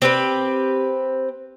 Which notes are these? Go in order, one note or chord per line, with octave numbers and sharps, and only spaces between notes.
C4 G4 B4